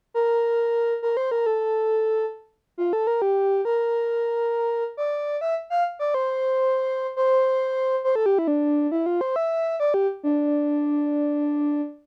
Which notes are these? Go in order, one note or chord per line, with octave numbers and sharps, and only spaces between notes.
A#4
A#4
C5
A#4
A4
F4
A4
A#4
G4
A#4
D5
E5
F5
D5
C5
C5
C5
A4
G4
E4
D4
E4
F4
C5
E5
D5
G4
D4